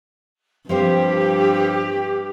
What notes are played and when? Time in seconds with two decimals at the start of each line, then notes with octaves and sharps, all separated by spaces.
0.69 G2 F3 C4 G4 C5